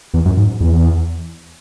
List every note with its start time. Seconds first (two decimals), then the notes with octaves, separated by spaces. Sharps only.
0.14 E2
0.26 F#2
0.37 G#2
0.61 E2